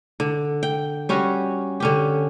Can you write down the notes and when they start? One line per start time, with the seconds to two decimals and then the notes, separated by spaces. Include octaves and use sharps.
0.20 D3
0.63 G5
1.09 G3 C#4 F#4
1.80 D3 C#4 G4